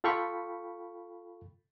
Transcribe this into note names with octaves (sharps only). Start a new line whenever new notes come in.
F4 A4 F5 G5 B5 C#6